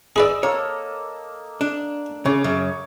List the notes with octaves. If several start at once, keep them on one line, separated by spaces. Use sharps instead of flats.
G#4 B4 D5 D#5 E6
A#3 A4 C#5
D4
C#3 C#5 D6
F#2 C#3